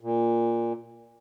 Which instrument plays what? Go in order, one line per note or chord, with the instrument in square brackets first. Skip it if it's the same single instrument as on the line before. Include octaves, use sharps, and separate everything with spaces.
[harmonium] A#2